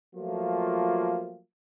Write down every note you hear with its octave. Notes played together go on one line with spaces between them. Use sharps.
F3 F#3 A3 A#3 F4